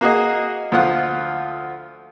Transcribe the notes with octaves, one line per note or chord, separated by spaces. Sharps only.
A#3 F#4 G#4 D#5
D2 F3 F4 F#5